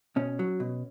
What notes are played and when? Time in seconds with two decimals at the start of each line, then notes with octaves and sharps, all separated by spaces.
0.16 B2 C#4
0.39 F#3
0.60 B2